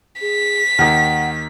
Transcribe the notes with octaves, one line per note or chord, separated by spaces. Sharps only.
G#4 B6
D#2 D#3 F#5